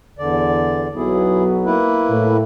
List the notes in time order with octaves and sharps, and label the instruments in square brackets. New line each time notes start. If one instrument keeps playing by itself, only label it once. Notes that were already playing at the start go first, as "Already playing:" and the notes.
[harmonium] E2 D3 D5
[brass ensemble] B1 F#3 B3 [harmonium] E4 G#4
[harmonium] A#3 E4 B4
[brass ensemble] A2